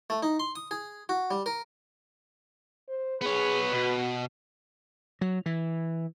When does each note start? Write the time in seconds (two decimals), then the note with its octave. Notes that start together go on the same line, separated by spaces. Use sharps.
0.10 A3
0.23 D#4
0.40 C6
0.56 D#6
0.71 G#4
1.09 F#4
1.31 G3
1.46 A#4
2.88 C5
3.21 B3 G#4 B4 C#5
3.73 B2 F#4
5.21 F#3
5.46 E3